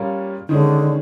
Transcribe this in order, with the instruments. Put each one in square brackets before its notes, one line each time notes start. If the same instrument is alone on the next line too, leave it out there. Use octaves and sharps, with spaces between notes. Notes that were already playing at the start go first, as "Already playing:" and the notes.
Already playing: [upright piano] A#2 G3 A#3 C#4
[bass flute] D3 [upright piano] D#3 G#3 C#4